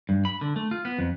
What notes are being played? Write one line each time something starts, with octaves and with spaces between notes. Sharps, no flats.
G2
B5
D3
A3
F4
B3
F2